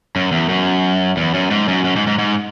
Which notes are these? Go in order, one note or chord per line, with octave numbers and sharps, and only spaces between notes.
F#2
E2
F#2
E2
F#2
G#2
F#2
F#2
G#2
G#2
G#2